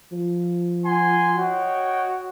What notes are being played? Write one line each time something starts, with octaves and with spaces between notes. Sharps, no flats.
F3
F#5 G#5 C6
F#4 C#5 D#5 G5